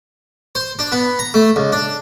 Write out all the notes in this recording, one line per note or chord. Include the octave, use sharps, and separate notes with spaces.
C5
D4
B3
A#5
A3
C#2
D4